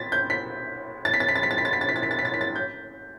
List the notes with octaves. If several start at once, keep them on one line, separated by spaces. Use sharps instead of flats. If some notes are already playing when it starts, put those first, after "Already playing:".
Already playing: A6 B6
G6
B6
A6
B6
A6
B6
A6
B6
A6
B6
A6
B6
A6
B6
A6
B6
A6
B6
A6
B6
A6
G6